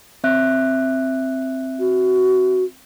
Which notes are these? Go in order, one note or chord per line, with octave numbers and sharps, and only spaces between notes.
C4 E5 F#6
F#4